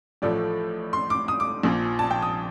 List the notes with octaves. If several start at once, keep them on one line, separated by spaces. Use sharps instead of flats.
A1 A2 F3 A3 D5
C6
D6
D#6
D6
A#1 A#2 F3
A5
G5
D#6